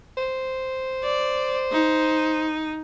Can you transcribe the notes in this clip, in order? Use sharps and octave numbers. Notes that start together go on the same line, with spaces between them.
C5
D5
D#4